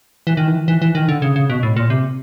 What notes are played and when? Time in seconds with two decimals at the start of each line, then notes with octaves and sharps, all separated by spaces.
0.27 E3
0.37 D#3
0.47 E3
0.58 D#3
0.68 E3
0.82 E3
0.95 D#3
1.09 D3
1.22 C#3
1.36 C#3
1.50 B2
1.63 A2
1.76 A#2
1.90 C3